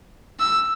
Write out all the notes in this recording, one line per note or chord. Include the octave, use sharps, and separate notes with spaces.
E6